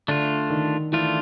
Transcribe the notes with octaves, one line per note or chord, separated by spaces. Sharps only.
D3 A3 D4 F4
D#3
E3 A3 D4 F4